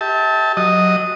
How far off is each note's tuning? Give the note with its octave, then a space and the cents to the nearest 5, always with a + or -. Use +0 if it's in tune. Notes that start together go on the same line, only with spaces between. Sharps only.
G4 +0 E5 -45 A5 +0
F#3 +0 D#5 +0